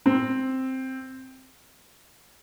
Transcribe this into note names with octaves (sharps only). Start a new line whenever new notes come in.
C4